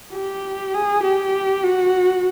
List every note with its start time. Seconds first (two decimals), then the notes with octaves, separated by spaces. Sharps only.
0.13 G4
0.74 G#4
1.03 G4
1.64 F#4